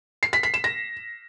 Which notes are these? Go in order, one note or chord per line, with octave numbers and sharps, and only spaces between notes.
C7
B6
B6
E7
A#6